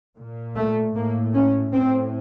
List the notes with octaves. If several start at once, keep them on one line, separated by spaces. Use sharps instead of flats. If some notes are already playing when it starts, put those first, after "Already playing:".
A#2
A3
A2 A#3
C#4
A2 C4